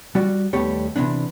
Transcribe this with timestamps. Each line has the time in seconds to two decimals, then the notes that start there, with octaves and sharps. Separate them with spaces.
0.15 G3 F#4 D5
0.53 D#2 G3 A3 B3 G4 C#5
0.96 C3 E3 B3 D4